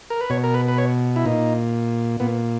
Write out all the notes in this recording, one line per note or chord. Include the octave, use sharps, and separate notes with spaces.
A#4
B4
B2 C#5
A#4
B4
B4
C#5
E4
A#2 D#4
A#2 B3